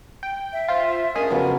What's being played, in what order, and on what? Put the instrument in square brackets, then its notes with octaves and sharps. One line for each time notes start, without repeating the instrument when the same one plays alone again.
[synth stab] G5
[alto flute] E5
[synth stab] F4 C5
[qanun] C#4 D4 A5 [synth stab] G#4 D#5 G#5 [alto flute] A#4
[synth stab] F2 [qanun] C#3 F#3 B3